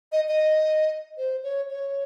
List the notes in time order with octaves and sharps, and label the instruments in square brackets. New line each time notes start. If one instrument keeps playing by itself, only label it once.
[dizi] D#5
D#5
C5
C#5
C#5